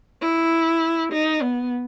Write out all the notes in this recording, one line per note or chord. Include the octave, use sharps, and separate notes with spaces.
E4
D#4
B3